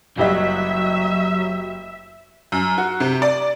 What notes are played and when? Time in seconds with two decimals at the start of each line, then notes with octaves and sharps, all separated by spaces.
0.18 F#1 F#3 G3 D#5 E5
2.52 F#2
2.78 F#4
3.00 C3
3.22 D5